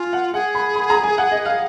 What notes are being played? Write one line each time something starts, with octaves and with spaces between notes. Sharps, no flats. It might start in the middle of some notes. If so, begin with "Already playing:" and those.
Already playing: F4 G#5
F#5
G#4 F#5
B5
B5
A#5
G#5
F#5
D#5
F5